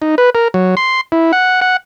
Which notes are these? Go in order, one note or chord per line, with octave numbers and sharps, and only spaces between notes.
D#4
B4
A#4
F#3
C6
E4
F#5
F#5